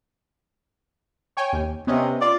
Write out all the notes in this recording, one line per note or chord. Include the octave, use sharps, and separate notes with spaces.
C#5 G5 G#5
D#2
C3 B3 C#4 D#5
F4 D5